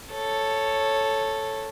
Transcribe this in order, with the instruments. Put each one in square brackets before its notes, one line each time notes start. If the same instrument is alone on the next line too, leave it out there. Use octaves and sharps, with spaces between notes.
[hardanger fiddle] A4 C#5